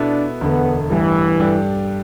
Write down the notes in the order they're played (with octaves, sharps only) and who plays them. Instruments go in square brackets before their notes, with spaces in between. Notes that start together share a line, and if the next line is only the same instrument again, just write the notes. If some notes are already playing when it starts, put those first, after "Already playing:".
Already playing: [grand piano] B2 B3 E4 A4 [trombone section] D4
[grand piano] E1 D2 D3 A3 [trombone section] B3
[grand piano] A1 G2 G3 [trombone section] E3
[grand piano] G2 G3 D4 A4